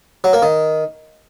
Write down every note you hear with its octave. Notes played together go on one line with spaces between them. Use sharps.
F#3
A#3
D#3